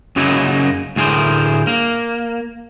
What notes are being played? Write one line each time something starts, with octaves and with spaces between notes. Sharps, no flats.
F#2 C#3 F#3 A#3 D#4 E4
D2 A2 G#4 A#4 C5
A#3